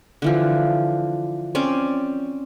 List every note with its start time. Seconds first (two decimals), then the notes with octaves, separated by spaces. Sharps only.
0.22 D3 E3 F3
1.55 C4 C#4 D5